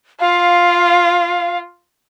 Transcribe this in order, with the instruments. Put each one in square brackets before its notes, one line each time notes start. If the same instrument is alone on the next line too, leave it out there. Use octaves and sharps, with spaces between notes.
[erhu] F4 [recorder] F5